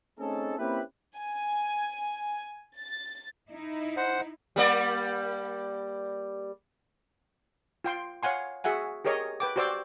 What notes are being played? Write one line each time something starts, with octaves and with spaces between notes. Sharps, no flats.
A3 C4 C#4 D#4 G#4 A4
A#3 C4 C#4 E4 G4 B4
G#5
A6
D#4 E4
C5 F#5
G3 A#3 D5
F4 G5 C6
C#5 F5 F#5 G#5 C6
F#4 G#4 E5 F#5 G#5
G4 G#4 A#4 C#5 D#5
B4 G5 D6
F#4 G4 C5 D5 D6 E6